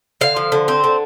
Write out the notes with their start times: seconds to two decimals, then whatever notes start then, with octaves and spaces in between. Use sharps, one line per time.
0.21 D3 F5
0.36 F3
0.52 D3
0.68 C4
0.84 D3